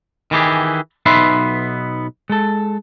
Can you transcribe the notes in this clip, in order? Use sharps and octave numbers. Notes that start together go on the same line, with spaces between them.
D#3 E3 G4 G#4
B1 B3 D#4 B4 E5 C6
G#3 A4